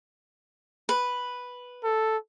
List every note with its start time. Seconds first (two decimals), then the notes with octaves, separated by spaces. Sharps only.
0.89 B4
1.84 A4